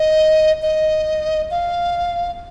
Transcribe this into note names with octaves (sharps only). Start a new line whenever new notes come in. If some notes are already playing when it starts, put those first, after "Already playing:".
Already playing: D#5
D#5
F5